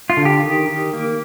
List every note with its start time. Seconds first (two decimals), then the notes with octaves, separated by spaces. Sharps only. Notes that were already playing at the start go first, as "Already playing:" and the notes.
0.10 F4
0.17 D3
0.25 G4
0.43 D#3
0.68 D#3
0.93 A#3